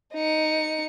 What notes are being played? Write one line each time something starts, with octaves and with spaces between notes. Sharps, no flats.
D#4 C#7